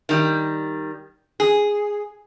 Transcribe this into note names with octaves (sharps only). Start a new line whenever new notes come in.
D#3 G3
G#4